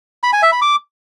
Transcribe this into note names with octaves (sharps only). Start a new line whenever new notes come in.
B5
G#5
E5
B5
D6